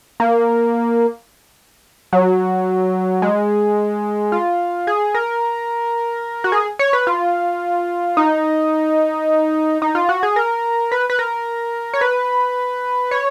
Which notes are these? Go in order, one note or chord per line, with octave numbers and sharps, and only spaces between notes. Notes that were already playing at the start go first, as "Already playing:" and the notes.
A#3
F#3
G#3
F4
G#4
A#4
F#4
G#4
C#5
B4
F4
D#4
D#4
F4
F#4
G#4
A#4
B4
B4
A#4
C#5
B4
C#5